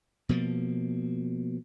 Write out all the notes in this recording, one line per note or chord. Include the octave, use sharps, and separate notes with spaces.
B2 F3 A#3